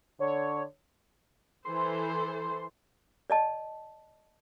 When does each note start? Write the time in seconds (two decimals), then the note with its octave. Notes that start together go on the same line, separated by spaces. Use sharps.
0.20 D3 C#5
1.65 E3 A4 C5 C6
3.30 D5 D#5 A5